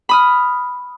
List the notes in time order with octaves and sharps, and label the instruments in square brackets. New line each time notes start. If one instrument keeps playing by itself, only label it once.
[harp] B5 D#6 F6